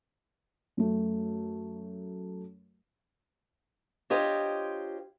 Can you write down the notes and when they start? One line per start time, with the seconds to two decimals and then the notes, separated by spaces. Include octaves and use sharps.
0.77 F#2 A3
4.10 D4 F4 G4 C5 C#5 D#5